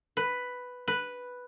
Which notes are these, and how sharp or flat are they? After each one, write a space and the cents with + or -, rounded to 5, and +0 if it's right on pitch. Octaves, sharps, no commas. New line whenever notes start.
B4 +5
B4 +0